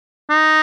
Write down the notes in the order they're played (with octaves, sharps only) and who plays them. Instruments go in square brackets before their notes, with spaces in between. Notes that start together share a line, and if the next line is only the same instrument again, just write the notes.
[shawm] D#4